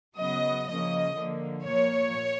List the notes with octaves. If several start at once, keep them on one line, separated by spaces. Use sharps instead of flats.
C#3 F#3 B3 D#5
C#3 F3 A#3 D#5
D3 F3 A#3
A#2 F3 A#3 C#5